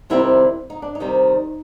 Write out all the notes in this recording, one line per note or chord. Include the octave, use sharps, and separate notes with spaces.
C3 D#3 G3 C4 E4
D#4
D4
D#4
C3 D#3 G3 C4